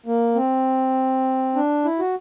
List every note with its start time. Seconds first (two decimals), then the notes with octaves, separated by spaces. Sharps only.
0.06 A#3
0.35 C4
1.55 D4
1.85 E4
1.99 F#4